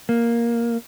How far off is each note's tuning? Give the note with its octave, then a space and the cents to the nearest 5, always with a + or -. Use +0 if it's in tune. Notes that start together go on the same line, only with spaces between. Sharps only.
A#3 +5